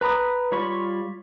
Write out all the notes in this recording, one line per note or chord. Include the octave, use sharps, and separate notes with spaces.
B4 A#5 B5 D#6
G3 F4 C#5 B5 C#6